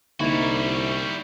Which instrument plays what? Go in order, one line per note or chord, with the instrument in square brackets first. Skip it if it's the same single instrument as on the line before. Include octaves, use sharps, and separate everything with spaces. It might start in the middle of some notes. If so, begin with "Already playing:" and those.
[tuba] C2 [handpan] D3 A#3 D#4 [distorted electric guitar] G3 F#4 [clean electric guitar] E4